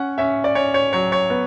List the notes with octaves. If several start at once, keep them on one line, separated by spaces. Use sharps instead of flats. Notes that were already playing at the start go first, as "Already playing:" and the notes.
Already playing: C#4 F#5
C#4 E5
D5
C#4 C#5
C#5
F#3 C#5
C#5
B3